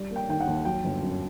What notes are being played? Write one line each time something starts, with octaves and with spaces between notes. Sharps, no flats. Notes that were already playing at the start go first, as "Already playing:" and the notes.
Already playing: G3
A#3
G5
D#3 G5
F#5
D#2
F#3 G5
G1
F#2